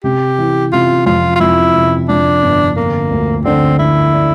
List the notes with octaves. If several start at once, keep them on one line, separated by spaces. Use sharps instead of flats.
C3 G4
E3
C3 F4
F2 F4
F4
F2 E4
C3
F2 D4
G1
D3 A#3
D2
D3 C4
D3 E4
D4